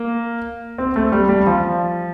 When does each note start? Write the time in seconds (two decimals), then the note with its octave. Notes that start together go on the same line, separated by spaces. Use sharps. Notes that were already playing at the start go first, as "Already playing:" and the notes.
Already playing: A#3
0.78 C4
0.96 A3
1.12 G3
1.29 G3
1.47 F3